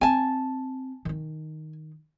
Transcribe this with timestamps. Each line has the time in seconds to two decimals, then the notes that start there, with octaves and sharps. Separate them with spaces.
0.01 C4 G#5 A5
1.05 D#3 D#4